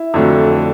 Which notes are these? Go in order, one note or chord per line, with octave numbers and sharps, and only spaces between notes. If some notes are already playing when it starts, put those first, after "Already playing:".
Already playing: E4
F2 D3 F#3 A3